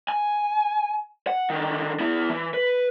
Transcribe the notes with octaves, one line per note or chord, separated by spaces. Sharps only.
G#5
F#5
D3 D#3
B3 E4
E3
B4